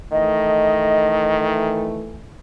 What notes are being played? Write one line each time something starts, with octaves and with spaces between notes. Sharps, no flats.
D#3 E3 A3 D#5